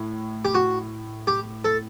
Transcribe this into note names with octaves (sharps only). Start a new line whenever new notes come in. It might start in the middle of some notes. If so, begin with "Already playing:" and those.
Already playing: A2
G4
F#4
G4
A4